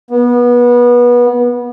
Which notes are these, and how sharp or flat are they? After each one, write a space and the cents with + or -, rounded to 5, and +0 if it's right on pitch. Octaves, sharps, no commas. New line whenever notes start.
B3 -25